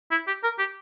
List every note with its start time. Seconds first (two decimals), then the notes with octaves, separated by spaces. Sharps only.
0.11 E4
0.27 G4
0.44 A#4
0.59 G4